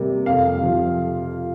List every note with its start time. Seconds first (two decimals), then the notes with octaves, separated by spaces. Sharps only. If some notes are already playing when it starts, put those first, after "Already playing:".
Already playing: C3 G3 A#3
0.26 F2 F5
0.62 C3 F3